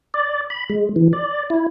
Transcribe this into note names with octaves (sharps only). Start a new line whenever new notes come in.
D5
B5
G#3
E3
D5
E4